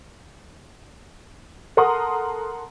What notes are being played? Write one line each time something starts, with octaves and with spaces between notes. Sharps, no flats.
A4 A#4 F#5 A#5 C6 D#6